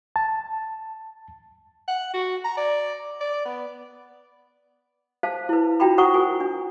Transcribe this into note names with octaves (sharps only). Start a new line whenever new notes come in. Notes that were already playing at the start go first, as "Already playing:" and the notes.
A5
F#5
F#4
A#5
D5
D5
B3
C5 F5 A5
E4 B4
D4 F4 F#4 G5 A#5 B5
F#4 C5 F#5 A#5 C#6 D#6
A#4 G#5 A#5
D4